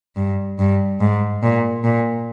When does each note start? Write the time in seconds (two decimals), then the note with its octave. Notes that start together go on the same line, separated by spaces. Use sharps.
0.16 G2
0.59 G2
1.00 G#2
1.43 A#2
1.84 A#2